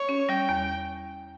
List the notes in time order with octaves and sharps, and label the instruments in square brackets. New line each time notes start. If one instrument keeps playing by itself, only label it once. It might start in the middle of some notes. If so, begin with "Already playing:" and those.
Already playing: [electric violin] C#5
[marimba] C#4
[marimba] G3 [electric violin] G5
[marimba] E2